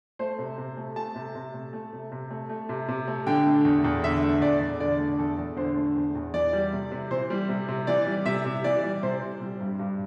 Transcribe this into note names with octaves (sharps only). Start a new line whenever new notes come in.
A3 C5
C3
C3
A3
A3 A5
C3
C3
A3
A3
C3
C3
A3
A3
C3
C3
A3
D3 G5
A3
E2
E2
D3 E5
A3
E2 D5
E2
D3 D5
A3
E2 A4
E2
D3 C5
A3
E2
E2
E3 D5
G3
C3
C3
E3 C5
G3
C3
C3
E3 D5
G3
C3 E5
C3
E3 D5
G3
C3 C5
C3
G3
G2
G2